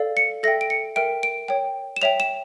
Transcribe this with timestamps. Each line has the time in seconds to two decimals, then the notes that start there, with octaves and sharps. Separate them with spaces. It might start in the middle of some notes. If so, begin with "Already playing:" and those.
Already playing: A4 D5 F5
0.17 C#7
0.43 A4 E5 G5 A#6
0.61 D7
0.70 C#7
0.96 A#4 E5 G5 D7
1.23 D7
1.48 C#5 G5
1.96 E7
2.02 C#5 E5 G5 F7
2.20 E7